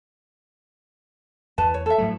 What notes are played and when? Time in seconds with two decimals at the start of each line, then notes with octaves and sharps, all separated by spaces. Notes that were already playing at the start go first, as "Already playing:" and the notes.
1.58 E2 B4 A5
1.74 C#5
1.86 A4 E5
1.98 A2 F#3 A3